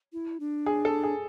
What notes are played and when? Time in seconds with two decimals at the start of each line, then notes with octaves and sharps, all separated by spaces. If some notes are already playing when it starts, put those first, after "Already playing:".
0.13 E4
0.40 D4
0.66 G#4
0.85 A4
1.03 G#4